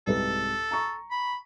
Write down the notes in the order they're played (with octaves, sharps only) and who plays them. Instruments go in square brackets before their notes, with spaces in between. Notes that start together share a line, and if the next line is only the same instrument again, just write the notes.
[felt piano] C2 G#2 B4 [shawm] A4
[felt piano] A#5 C#6
[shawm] B5